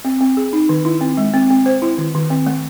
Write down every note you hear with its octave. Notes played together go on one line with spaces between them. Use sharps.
C4
C4
G#4
D#4
D#3
E4
C4
G#3
C4
C4
C5
E4
D#3
D#3
C4
A3